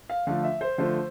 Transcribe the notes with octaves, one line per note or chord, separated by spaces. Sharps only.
F5
D3 F3 A3 F5
E5
C5
D3 F3 A3 C5